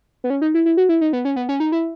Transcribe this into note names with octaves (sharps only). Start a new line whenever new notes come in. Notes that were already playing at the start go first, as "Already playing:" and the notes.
B3
C#4
D#4
E4
E4
F#4
E4
D#4
B3
C#4
B3
C#4
D#4
E4